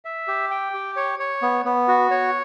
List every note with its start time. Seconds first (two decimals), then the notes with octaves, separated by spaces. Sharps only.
0.05 E5
0.28 G4
0.51 G5
0.74 G4
0.96 C#5
1.20 C#5
1.42 B3
1.65 B3
1.88 F#4
2.11 C#5